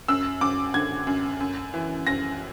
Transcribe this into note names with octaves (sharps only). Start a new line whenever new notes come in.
F#2 E6
F#2 D6
D3 G#6
F#2
F#2
E3
F#2 A#6